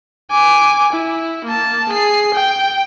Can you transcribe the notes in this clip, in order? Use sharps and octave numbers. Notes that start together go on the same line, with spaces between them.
G#5 D6
E4
A#3 A5
G#4 C7
G5